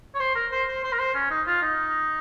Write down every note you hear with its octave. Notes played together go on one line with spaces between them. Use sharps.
C#5
C5
A#4
C5
C5
C5
A#4
C5
C#4
D#4
F4
D#4